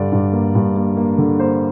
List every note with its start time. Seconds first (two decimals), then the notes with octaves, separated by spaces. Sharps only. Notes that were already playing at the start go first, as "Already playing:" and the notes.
Already playing: G2 D3 D5
0.12 G2
0.33 A#3
0.55 G2
0.76 A#3
0.97 A#3
1.18 D3
1.39 A#3 C5